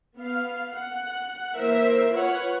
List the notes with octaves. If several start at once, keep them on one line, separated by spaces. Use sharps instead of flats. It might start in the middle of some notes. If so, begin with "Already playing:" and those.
B3 F5
F#5
E3 A#3 A#4 C5 E5
F4 B4 C#5 F#5